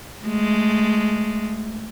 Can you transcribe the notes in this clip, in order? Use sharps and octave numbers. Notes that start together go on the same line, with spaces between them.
G#3 A3